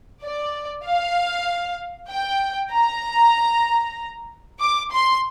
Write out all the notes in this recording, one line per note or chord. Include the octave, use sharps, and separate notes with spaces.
D5
F5
G5
A#5
D6
C6